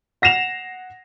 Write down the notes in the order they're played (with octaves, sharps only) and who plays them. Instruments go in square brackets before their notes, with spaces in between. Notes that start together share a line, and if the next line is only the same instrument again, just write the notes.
[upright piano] F#5 A#6 C7 E7 F7